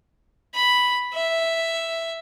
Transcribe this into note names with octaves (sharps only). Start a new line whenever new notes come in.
B5
E5